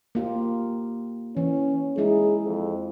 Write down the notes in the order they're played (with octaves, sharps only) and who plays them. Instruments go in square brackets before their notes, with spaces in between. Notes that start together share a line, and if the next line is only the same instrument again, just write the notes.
[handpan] A#3 F4 G4
[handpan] E3 [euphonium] C#4
[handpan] G#3 D#4 E4 [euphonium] G#4
[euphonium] F2